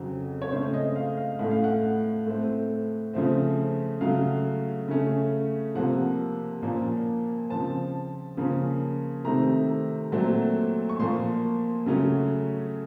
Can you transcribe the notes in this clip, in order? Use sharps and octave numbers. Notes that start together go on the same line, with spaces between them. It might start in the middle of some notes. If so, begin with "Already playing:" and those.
Already playing: F2 C#3 F#3 C4
C#5
C#3 A3 C4 C5
D#5
F5
F5
A2 A3 C#4 F#5
F5
F#5
A2 A3 C4
C#3 F3 A3 C4
C#3 F#3 A3 F5
C#3 A3 C#4
C3 F3 A#3 F#5
A#2 F3 A#3 C#4
C#3 F3 C4 A5
C#3 F3 A#3 C#4
C3 D#3 A3 C4 A#5
A#2 F#3 A3 C4
C#6
A#2 F3 A#3 C6
C#3 F#3 A3 C#4